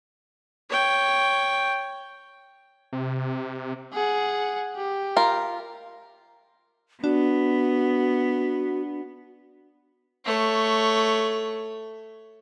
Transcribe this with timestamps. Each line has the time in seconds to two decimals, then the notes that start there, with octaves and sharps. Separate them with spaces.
0.70 C#5 G5
2.93 C3
3.93 G#4 F#5
4.76 G4
5.17 F4 A#4
7.04 B3 D4 F#4
10.25 A3 C#5